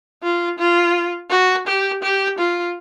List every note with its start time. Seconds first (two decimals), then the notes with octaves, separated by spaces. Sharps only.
0.23 F4
0.58 F4
1.30 F#4
1.67 G4
2.02 G4
2.38 F4